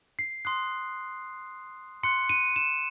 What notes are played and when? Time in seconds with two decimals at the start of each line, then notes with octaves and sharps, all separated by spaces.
0.19 C7
0.45 C6 D#6 F#6 C7
2.03 C6 F#6 C#7
2.29 D#7
2.56 E7